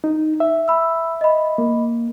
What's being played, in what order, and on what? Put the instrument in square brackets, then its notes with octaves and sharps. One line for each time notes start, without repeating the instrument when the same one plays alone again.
[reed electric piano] D#4
E5
[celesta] B5 E6
D#5 B5
[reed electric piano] A#3